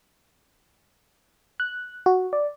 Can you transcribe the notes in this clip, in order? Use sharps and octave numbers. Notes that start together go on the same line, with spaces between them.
F#6
F#4
D5